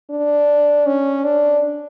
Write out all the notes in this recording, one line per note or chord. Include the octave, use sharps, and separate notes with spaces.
D4
C#4
D4